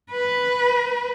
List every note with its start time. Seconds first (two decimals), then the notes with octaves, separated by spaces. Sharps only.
0.11 B4